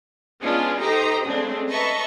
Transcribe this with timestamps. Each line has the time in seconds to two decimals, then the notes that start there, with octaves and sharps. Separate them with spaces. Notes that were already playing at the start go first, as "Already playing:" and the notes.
0.41 G#3 B3 C#4 D4 F4 G#4
0.80 D#4 G4 A4 C5 A#5 D#6
1.23 C#3 G#3 A3 C4 D4
1.69 B4 D#5 E5 A5 A#5 C#6